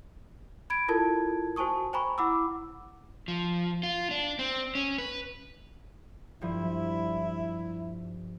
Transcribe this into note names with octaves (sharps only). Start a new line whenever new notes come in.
B5 G#6 D7
E4 F4 A4 A#4 A5 G#6
F#4 C5 G#5 A5 C#6 D#6
C5 G5 G#5 A#5 B5 C#6
E4 F#5 B5 D6 E6
F3
F4
D4
C4
C#4
B4
G2 F3 E4